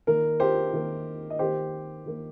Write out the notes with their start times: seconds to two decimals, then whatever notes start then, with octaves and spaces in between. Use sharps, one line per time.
0.07 D#3 A#3 A#4
0.40 G4 C5
0.73 D#3 A#3
1.30 D#5
1.39 D#3 A#3 G4 C5
2.05 D#3 A#3